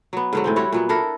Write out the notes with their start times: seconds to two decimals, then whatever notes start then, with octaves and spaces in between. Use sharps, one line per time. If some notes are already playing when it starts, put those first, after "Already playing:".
0.13 F#3 B3
0.33 G#2 D3 F#3
0.44 A2 E3 C4
0.56 G3 E4 F#4 C#5
0.72 A#2 F#3 B3
0.89 D4 E4 A4 A#4